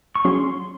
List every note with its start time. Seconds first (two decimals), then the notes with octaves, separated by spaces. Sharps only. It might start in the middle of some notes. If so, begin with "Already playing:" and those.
0.15 C#6
0.25 F#3 C#4 G#4 C6